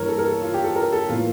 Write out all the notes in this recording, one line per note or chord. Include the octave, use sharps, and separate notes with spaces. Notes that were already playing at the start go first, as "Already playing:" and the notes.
Already playing: G2 E3 A#3 A#4 C#5
A4
A#4
A4
F4
G4
A4
A#4
A4
A2 E3 A#3 F4